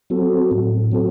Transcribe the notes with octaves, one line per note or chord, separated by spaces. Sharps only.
F#3 C4 F#4 A4
A2
F#3 C4 F#4 A4